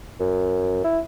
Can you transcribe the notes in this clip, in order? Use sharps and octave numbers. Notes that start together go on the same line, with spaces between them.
F#2
E4